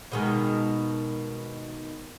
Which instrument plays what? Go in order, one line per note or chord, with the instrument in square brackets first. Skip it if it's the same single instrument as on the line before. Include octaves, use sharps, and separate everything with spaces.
[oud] B2 D#3 G#3